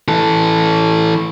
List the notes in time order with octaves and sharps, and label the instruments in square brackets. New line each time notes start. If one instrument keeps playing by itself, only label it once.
[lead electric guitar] E3 A4